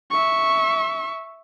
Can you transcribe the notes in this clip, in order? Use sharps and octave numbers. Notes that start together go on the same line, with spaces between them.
E5 C#6